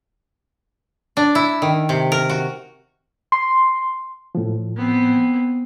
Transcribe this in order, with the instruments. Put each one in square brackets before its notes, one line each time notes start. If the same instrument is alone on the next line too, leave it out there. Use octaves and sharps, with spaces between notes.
[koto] D4
E4
D#3
C3
A#4
F#4
[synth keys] C6
[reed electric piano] A2 F3
[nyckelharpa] B3 C4